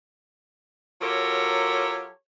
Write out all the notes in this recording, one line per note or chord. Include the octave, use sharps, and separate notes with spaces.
F#3 F4 G4 A4 A#4 C#5